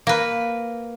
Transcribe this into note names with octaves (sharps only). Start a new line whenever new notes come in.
A#3 B4